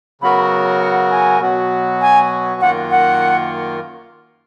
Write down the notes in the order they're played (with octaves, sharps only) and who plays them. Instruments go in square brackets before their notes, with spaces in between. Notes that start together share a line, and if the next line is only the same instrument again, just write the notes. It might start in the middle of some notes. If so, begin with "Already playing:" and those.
[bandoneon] C#3 F#3 B3 F#4 A#4 [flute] B5
[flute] F#5
G#5
[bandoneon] B2 F#3 B3 F#4
[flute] G#5
[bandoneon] F#2 D#3 A#3 F4 A#4 [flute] F#5
[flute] F#5